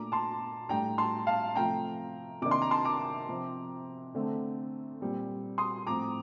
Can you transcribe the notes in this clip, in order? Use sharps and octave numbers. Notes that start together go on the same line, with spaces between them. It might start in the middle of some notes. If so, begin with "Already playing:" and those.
Already playing: A#2 A3 D4 A#5 D6
A5 C6
A2 G3 D4 G5 A#5
A5 C6
F5 A5
C3 F3 A3 G5 A#5
C3 D#3 A#3 D4 D6
C6
A#5
A5 C6
A#5 D6
C3 F3 C4
D3 A3 C4
A#2 G3 C4
C6 D#6
A2 F3 C4 A#5 D6